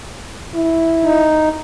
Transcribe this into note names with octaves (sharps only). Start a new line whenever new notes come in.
E4
D#4